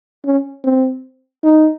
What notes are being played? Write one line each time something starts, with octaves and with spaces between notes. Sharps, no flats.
C#4
C4
D#4